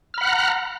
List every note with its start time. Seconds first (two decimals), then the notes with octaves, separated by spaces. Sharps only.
0.14 F6
0.18 B5
0.21 F#5
0.25 F#6
0.28 A#5